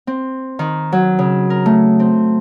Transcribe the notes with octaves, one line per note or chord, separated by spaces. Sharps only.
C4
D#3
F#3
C#3
A#4
A3
C4